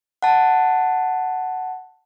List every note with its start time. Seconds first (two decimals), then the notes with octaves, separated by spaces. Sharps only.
0.22 F#5 A5